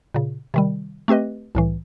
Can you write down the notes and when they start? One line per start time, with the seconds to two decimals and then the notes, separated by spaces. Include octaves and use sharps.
0.14 A#2 C#3
0.54 C3 D#3 G3
1.08 A3 C4 G4 B4 D#5
1.55 C2 A2 E3